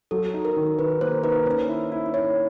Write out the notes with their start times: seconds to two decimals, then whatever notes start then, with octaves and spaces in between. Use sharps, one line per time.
0.11 F#3 A4
0.34 D#4
0.45 A#4
0.56 D#3
0.79 D#3 B4
1.01 A#3 C5
1.24 D#4 B4
1.46 C#4 C5
1.68 E4
1.92 E4
2.14 E4 C#5